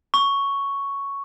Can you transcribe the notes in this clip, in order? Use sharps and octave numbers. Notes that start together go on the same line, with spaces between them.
C#6